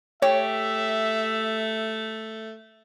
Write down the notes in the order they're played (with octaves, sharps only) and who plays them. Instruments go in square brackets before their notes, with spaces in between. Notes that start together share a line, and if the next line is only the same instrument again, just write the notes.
[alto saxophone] A3 [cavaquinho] G4 [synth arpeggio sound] C#5 [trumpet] E5